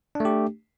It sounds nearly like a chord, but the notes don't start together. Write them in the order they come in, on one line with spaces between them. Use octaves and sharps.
D4 A3 G4